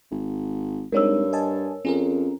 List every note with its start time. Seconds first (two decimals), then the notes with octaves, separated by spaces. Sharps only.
0.11 G#1
0.92 G2 G#3 C4 D#4 A#4 C#5 E6
1.33 D#5 G#5 A5
1.85 F2 C#4 G#4 A#4